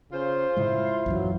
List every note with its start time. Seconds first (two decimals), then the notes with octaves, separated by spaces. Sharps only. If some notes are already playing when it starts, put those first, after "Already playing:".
0.12 C#3 F4 C5
0.57 A2 C#3 G#3 E4
1.06 A#1 F#2 E3 F#3